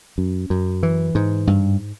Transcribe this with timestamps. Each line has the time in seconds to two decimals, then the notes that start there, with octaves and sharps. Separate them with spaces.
0.18 F#2
0.50 F#2
0.83 E3
1.15 G#2
1.47 G2